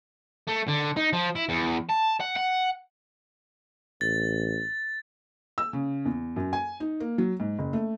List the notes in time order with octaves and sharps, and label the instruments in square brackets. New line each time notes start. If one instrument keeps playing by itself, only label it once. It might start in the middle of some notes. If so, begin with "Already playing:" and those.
[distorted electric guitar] A3
D3
D#4
F3
E4
E2
A5
F#5
F#5
[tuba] A1 [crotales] A6
[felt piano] E6
C#3
E2
F#2
G#5
D#4
A#3
F#3
G#2
F#1
A3